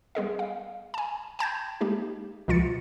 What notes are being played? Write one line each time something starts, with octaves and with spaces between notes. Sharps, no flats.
G3 B3 G#4 D#5
F5
G#5 A5
G5 A5 G6 G#6
G#3 A#3 D#4 G4
C#2 B2 F3 F4 A6 C#7